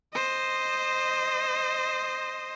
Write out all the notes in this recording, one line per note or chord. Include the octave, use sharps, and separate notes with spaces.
C5 D#5